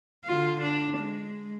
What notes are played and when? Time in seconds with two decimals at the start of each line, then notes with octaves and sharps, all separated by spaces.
0.25 D3 F4
0.61 D4
0.97 G#3